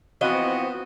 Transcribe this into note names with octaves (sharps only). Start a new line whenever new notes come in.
E3 F3 B3 C4 F#4 D#5